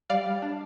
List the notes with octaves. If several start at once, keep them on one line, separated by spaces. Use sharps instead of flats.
G3 D5 F5
G3
D4